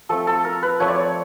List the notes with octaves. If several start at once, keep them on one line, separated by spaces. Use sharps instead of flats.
F3 A3 C4 A4
A4
A#4
B4
F3 A3 C4 C#5
D5
C#5